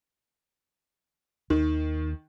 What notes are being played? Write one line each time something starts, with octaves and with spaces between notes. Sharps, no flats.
D#2 D#3